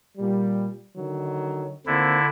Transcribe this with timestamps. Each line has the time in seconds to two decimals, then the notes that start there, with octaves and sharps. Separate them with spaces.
0.17 A#2 G3
0.95 D3 D#3 F#3
1.86 D#2 D3 A#3 C4 E4